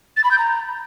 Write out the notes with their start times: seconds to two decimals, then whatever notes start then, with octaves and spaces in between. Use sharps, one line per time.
0.16 A6
0.24 B5
0.31 G6
0.38 A#5